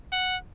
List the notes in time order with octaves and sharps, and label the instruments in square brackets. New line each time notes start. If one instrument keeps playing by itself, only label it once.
[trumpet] F#5